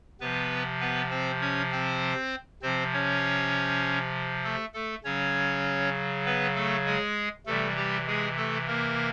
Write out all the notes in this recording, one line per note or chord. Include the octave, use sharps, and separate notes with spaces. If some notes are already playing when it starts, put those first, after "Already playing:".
C3 F3 B3 B4
B3 B4
C4 C5
C#4 C#5
C4 C5
C3 F3 C4 C5
C#4 C#5
A3 A4
A3 A4
C#3 F#3 C#4 C#5
B3 B4
A3 A4
G#3 G#4
C3 E3 G3 A3 A4
G3 G4
G#3 G#4
A3 A4
A#3 A#4